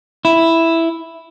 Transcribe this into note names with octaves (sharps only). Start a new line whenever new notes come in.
E4